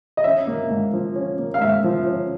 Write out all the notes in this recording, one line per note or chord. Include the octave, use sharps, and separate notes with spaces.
D#5
C#4 E5
A#3
G#2
F3
C#4
A#3
F5
G#2 E5
F3
C#4